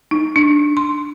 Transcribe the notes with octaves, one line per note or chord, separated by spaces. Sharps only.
D#4
D4
C6